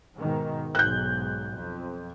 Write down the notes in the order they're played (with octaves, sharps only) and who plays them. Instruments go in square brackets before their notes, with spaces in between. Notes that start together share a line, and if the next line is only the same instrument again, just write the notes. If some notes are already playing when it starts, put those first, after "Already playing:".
[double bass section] G#2 B2 D#3
[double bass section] B1 G#2 [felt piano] F#6 G6
[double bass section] F2